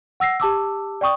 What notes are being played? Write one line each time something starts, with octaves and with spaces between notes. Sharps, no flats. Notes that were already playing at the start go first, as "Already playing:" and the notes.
F#5 E6 A#6 C7
G4 A5 D6 E6
D5 G5 C#6 D#6